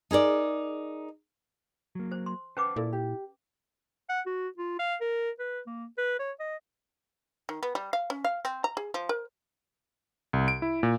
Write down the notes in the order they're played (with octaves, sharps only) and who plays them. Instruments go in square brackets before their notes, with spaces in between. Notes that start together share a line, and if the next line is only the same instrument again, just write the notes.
[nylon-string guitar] D#4 G#4 A#4 D5
[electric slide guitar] F#3 A#3
[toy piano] C5
C6
[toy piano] C#4 B4 D6 [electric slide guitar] C5 F#5 A5
[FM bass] A#2 [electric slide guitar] E4 [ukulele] A4 D5
[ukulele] G4
[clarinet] F#5
F#4
F4
F5
A#4
B4
A#3
B4
C#5
D#5
[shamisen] D#3
B3
G3
F5
C#4
F5
C4
A#5
G#4
F3
A#4
[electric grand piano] C2
D7
E4
A#2